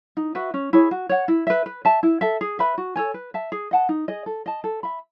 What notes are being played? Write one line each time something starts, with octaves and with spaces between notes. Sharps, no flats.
D#4
F#4 B4 E5
C#4
E4 G#4 C#5
F#4
C#5 F#5
E4
B4 E5
B4
E5 A5
E4
A4 E5
G#4
B4 E5 B5
F#4
A4 C#5 G#5
B4
E5 A5
G#4
D#5 F#5 A5
D#4
G#4 D#5
A4
D#5 A5
A4
E5 B5